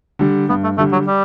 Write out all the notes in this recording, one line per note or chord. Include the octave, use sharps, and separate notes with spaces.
D3 G3
G2 B3
A3
D3 G3 A3
F#3
G3